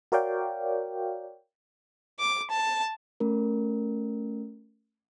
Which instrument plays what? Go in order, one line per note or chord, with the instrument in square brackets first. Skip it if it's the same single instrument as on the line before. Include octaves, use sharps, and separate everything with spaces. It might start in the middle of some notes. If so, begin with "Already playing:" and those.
[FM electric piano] F#4 A#4 C#5 D5 F5 G5
[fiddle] D6
A5
[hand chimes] A3 C#4 A#4